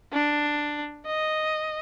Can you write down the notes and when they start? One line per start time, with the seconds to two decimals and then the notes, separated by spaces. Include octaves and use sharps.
0.13 D4
1.06 D#5